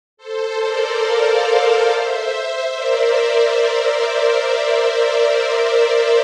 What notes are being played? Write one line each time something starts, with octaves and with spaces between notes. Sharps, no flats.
A4 C5
A#4 D5
D5 F5
C5 E5
A#4 D5